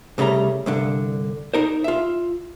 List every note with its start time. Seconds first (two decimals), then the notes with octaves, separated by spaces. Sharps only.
0.18 C2 C#3 G3 A3 A#5
0.66 C2 G2 D3
1.54 D#4 A#4 C5
1.84 F4 E5